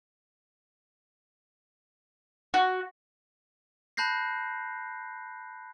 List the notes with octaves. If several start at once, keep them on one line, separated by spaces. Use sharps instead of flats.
F#4
A5 B5 F#6 G6 A#6 C7